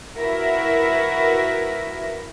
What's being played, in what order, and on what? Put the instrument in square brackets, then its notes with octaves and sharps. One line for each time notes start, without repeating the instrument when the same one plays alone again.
[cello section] E4 F#4 A#4 B4 E5